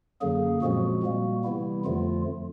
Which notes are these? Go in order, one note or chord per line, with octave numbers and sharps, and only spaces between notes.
F#2 D3 F#3 A#3 G#4
A#2 F3 G#3 C4 F#4
A#2 G3 A#3
C3 E3 G3 B3 E4
F2 D3 F3 A3 F4